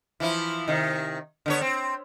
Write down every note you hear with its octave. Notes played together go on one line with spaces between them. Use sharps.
E3 F3 E4
C3 D#3
D3 B3 C#5
C4